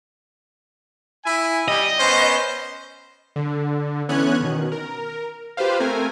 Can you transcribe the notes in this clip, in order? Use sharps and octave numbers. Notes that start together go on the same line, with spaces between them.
E4 G#5
G3 D#5
B3 C#4 C5
D3
D3 E3 B3 C#4 F#6 G#6
B2 D#3
A#4
F4 G4 B4 C5 F5
A3 C4 A#4 G#5